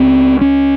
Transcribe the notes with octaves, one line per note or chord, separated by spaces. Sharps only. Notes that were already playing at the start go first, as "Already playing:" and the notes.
Already playing: C#2 C#3 C4
C#4